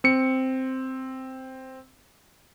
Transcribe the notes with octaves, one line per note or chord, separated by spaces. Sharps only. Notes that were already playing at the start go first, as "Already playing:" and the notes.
C4 C#7